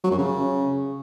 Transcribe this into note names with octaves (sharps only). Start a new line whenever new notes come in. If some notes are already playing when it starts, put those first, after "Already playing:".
F#3
F#2
C#3